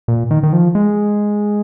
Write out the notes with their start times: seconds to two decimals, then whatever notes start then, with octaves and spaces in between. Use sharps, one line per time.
0.08 A#2
0.31 D#3
0.43 D#3
0.53 F3
0.75 G#3